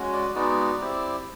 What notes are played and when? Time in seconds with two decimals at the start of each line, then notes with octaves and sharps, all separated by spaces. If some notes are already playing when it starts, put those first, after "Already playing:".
Already playing: G#3 C#4 F#4
0.13 D5
0.35 G#3 B3 D#4 F#4 D5
0.80 C4 E4 G4